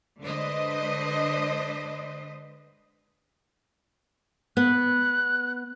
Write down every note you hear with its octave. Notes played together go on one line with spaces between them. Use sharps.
D3 G#3 D4 B4 C5 D#5
B3 F#6